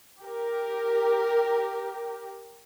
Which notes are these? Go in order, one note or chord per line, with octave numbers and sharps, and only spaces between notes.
G4 A#4